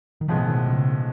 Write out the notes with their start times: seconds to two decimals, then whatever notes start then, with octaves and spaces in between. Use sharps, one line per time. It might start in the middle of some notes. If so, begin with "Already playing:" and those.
0.21 D#3
0.28 B1 A2 E3 F3 G#3 B3
0.47 D#3
0.66 C#3